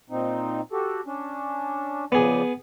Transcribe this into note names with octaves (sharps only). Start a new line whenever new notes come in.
A#2 C4 D#4
F#4 G4 A4
C#4 D4
C#3 F3 B3 G#4 D5